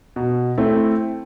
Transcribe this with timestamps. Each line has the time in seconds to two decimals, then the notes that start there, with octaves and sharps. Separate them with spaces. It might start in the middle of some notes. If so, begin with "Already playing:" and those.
0.16 B2
0.58 A3 C4 E4